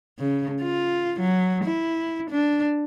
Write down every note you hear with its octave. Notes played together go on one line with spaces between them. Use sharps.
C#3
F4
F#3
E4
D4